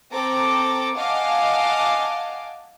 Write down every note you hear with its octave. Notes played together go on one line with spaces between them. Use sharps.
C4 A4 A#5 D6
D#5 F5 F#5 G#5 A5 D6